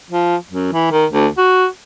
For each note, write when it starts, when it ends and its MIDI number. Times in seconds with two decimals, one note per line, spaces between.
0.10 0.36 53
0.51 0.71 42
0.72 0.89 52
0.91 1.06 51
1.12 1.27 38
1.38 1.67 66